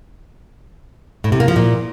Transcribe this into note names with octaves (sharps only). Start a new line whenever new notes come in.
A2
C3
A#3
F3
A#2